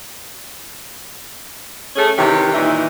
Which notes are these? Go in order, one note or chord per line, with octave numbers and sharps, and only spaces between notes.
A3 C#4 G#4
C3 D#3 E3 C#4 G4
A#2 D#3 E3 G3 D#4 E4